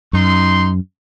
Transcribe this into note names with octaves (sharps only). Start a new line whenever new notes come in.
F#2 D#4 C6